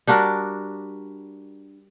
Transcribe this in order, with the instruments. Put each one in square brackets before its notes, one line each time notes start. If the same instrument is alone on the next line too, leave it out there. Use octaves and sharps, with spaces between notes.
[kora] G3 D4 F#4 A#4